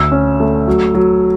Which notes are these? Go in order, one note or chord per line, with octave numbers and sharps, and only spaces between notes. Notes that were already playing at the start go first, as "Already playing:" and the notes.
Already playing: D2 E6
C#4
A3
F#3
F#3